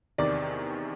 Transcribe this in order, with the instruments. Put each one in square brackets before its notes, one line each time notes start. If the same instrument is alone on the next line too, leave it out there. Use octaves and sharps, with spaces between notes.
[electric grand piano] E2 C3 D#3 [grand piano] D5